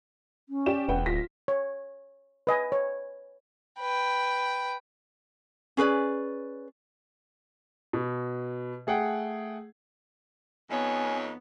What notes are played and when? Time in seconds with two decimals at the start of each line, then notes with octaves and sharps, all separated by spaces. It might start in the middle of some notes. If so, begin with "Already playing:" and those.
0.49 C#4
0.66 G4 D5 E7
0.88 E1 B4 F#5 G5
1.06 D1 F4 A#6 B6
1.48 C#5
2.47 B4 D#5 G#5
2.72 C#5
3.79 B4 G5
5.77 C#4 G#4 B4 D5
7.93 B2
8.87 A3 G#4 F#5 G5
10.70 F2 B3 D#4 C#5 G#5